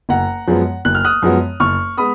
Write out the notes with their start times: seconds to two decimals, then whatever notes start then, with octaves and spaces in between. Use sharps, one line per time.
0.09 F#1 F#5 A#5
0.47 F#2 F3 G#3 B3
0.85 F#1 F#6
0.95 F6
1.05 D#6 F#6
1.22 F#2 F3 G#3 B3
1.60 F#1 C#6 F6
1.97 G#3 B3 B5 D#6